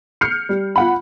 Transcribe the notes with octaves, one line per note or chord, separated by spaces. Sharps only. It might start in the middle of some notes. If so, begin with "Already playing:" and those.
F6 G6 C7 C#7
G3
F4 F#5 B5